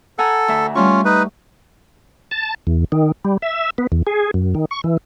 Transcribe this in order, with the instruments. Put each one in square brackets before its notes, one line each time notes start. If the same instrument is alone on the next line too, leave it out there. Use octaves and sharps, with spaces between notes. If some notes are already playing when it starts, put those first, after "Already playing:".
[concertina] A4 [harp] F#5 G#5 A#5
[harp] D2 E5
[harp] G3 A3 C#6 [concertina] C#4 F4
[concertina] D#4 B4
[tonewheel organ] A5
E2
D#3
G3
E5
B3
E2
G#4
F#2
D#3
C#6
E3